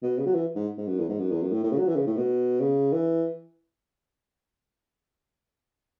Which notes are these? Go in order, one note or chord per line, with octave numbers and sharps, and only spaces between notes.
B2
C#3
F#3
E3
G#2
G#2
F#2
E2
G#2
F#2
E2
F#2
A2
A2
C#3
F#3
E3
C#3
A2
B2
C#3
E3